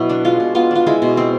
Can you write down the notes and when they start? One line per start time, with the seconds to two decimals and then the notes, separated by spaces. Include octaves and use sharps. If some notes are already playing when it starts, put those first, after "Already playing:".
Already playing: B2 F#3 B3 E4
0.09 D4
0.25 G#3 F4
0.40 B2
0.55 B3 F4
0.71 D4 F4
0.87 G#3 E4
1.02 B2
1.17 C4